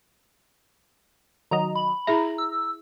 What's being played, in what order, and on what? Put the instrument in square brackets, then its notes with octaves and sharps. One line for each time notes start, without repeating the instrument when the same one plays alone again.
[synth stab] D#3 F#3 D#5 [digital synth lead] A#5
[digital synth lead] B5
[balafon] E4 G#4 E5 [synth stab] A#5
[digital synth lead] E6